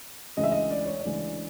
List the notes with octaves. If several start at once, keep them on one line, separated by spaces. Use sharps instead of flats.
D2 C#3 E3 G#3 D#5
E5
D#5
D5
C#5
D5
D2 C#3 E3 G#3